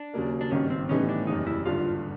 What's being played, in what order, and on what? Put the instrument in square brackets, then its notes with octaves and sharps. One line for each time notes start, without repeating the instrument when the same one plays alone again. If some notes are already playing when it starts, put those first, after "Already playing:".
Already playing: [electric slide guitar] D4
[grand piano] D#2 C#3 F#3 A#3
[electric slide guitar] D4
[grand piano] G#1 G2 D#3 [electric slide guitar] C#4
[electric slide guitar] C4
[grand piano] A2 E3 G3 B3 D#4 [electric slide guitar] C#4
[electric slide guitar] D4
[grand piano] F#1 E2 C3 [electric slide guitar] D#4
[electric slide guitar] E4
[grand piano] G#1 G2 D3 [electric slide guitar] F4